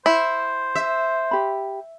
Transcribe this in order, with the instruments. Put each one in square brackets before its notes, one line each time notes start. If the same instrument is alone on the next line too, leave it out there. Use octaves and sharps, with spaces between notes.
[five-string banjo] E4 [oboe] C5
[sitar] E5
[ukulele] G4 B5